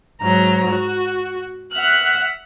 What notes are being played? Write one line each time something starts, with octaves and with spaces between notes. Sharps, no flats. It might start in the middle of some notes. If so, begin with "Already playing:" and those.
G#2 F#3 A#5
F#4
E5 F#5 F6 F#6